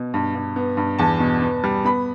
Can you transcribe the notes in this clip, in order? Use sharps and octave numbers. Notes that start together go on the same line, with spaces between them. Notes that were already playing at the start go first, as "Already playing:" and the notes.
Already playing: B2
G2
G2
B3
G2
E2 A5
B2
B3
G3
B3 B5